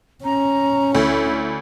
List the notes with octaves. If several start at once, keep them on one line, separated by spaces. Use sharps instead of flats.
C#4 A#5
D2 E4